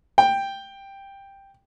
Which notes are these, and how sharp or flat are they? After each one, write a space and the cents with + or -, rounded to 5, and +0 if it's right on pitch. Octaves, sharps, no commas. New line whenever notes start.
G5 +5